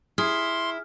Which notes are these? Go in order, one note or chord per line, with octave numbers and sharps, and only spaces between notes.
E4 G#4 C6 F6